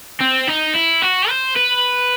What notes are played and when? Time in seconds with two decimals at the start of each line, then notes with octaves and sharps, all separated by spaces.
0.21 C4
0.48 D#4
0.75 E4
1.03 F#4
1.30 C5
1.56 B4